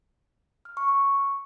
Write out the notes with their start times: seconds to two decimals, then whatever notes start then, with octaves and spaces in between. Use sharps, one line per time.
0.65 F6
0.77 C#6
0.89 C#6